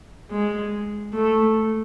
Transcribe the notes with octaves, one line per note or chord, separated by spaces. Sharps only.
G#3
A3